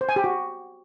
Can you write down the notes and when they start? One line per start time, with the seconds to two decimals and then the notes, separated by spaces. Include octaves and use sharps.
0.01 C5
0.09 G#5
0.16 G4
0.24 F#4